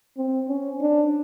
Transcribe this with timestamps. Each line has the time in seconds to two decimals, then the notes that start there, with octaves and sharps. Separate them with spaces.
0.17 C4
0.48 C#4
0.81 D4